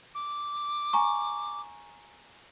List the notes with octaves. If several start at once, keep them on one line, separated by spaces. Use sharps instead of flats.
D6
G#5 A#5 C#6